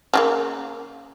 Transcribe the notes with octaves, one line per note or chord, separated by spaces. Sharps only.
C#3 F#3 A#3